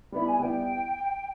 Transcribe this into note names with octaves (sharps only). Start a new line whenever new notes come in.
G3 B3 E4 B5
G#5
G3 B3 E4 G5